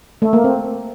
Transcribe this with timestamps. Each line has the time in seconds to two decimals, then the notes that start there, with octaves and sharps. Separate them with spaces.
0.22 A3
0.33 A#3
0.44 C4